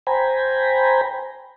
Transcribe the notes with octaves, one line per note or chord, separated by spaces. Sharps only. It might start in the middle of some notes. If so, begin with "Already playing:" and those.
C5 G5 G#5 A#5 B5